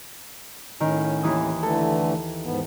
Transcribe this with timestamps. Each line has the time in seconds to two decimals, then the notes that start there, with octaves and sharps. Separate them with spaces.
0.80 A2 D#3 C#4
1.23 D#2 E3 D#6
1.63 D3 E3 A3 A4
2.45 G#2 B3